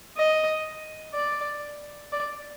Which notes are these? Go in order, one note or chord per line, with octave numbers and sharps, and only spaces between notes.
D#5
D5
D5